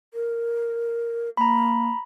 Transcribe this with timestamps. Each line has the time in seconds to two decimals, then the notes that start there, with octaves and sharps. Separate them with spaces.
0.14 A#4
1.37 A#3 A#5 B5